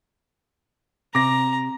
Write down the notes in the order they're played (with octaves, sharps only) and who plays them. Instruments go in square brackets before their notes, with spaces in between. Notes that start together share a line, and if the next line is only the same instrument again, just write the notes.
[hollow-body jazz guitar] C3 [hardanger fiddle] A#5 [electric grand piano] D6 A#6